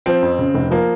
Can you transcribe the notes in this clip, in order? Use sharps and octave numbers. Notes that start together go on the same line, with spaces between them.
F3 C4
F2
C#3
F1
F3 A#3